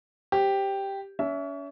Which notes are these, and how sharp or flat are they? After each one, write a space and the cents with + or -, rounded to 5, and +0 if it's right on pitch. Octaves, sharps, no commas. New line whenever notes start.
G4 +0 C5 +0
C#4 +35 E5 +0